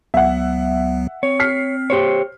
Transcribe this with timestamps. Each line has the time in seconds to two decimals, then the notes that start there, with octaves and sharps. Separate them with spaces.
0.14 C#2 F#3 B3 E5 F#5
1.23 C4 C#5
1.40 F6 B6 C7
1.90 G4 C5 C#5